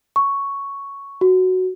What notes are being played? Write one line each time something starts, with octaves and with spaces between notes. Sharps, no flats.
C#6
F#4